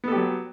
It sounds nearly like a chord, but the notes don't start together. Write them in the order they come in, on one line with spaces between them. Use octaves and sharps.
B3 A4 G4 F#3